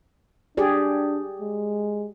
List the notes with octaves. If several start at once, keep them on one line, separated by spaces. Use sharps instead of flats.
D4 G4 G#4 D5
G#3